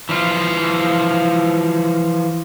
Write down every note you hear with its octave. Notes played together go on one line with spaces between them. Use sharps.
E3 F3 F4